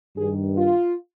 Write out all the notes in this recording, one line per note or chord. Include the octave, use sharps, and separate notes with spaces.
G2 D#3 G#4
F4